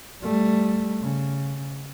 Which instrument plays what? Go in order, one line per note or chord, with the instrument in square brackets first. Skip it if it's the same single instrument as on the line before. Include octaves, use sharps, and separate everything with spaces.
[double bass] G3 A3
C#3